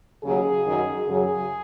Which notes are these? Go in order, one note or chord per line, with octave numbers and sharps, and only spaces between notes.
D#2 C#3 F#3 G#4
F#2 D#3 F#3
F#2 C#3 F#3 G#4